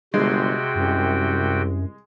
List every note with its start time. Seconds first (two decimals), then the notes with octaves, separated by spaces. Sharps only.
0.14 G1 C3 G#3 F#4 G5
0.76 C2 F#2